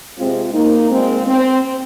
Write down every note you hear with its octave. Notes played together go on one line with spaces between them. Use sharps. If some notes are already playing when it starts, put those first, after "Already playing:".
C3 G#3 C4 F4
A#3 D#4
A#2 G#3 C4
C4